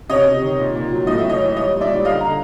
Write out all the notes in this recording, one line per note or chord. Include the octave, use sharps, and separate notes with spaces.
C3 C#5 D#5
C3
D#3
A#2
A#2
F#3
A2 D#5
E5
A2
C#5 D#5
E3
G3 C#5 D#5
A#2
D5 E5
G3
D3 D#5 F5
D3 A#5